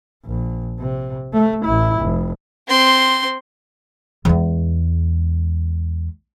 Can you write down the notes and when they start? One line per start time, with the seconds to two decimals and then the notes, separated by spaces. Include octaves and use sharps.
0.25 A#1
0.79 C3
1.33 A3
1.65 A1 E4
2.00 F1
2.68 C4 C6
4.25 E2 G#3